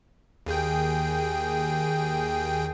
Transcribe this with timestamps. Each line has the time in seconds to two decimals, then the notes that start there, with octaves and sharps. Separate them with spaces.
0.46 D#2 G#4 G5